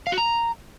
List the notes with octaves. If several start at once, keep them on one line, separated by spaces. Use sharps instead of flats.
F5
F#4
A#5